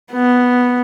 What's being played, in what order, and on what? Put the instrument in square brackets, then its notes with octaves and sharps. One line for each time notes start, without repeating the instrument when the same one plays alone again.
[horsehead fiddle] B3